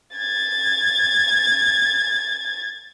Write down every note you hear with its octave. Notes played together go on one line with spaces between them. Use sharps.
G#6 A6